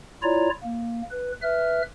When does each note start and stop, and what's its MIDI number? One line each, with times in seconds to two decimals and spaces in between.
0.23 0.50 64
0.23 0.50 65
0.23 0.50 73
0.23 0.50 74
0.23 0.50 82
0.64 1.02 58
1.11 1.32 71
1.42 1.82 71
1.42 1.82 76
1.42 1.82 89